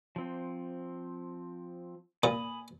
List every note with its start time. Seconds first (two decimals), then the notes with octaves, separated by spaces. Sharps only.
0.16 F3 C4
2.24 A#2 G#5 B5 D#6